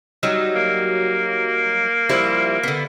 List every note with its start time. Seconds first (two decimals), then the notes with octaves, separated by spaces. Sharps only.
0.23 F#3 G3 D#4
0.55 A#3
2.09 F3 G3 E4
2.63 D3 B3